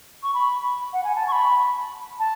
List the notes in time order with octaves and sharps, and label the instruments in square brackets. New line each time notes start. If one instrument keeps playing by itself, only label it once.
[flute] C#6
B5
F#5
G#5
A5
C#6
B5
A5